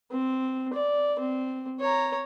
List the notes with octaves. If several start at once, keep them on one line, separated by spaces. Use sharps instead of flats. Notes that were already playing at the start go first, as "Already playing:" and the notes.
C4
D5
C4
C#5 A#5